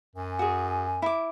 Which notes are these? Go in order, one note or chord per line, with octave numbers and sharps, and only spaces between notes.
F#2 G#5
F#4 G#4
E4 D6